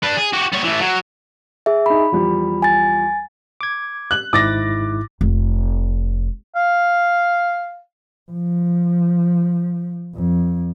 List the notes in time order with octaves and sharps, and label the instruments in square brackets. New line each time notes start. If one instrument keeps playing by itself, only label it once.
[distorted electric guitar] D4 B4
G#4
F#4 G4
G3 C#5
E3 A3
F#3
[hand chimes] G#4 E5
[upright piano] D#4 G#4 [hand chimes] B5
[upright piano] E2 F3 G3
[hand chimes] G#5 A6
[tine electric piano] D6 G#6
[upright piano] F#6 F#7
[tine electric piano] G#1 G#2 E4 [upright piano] D6 A6 A#6
[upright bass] F1
[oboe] F5
[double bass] F3
F2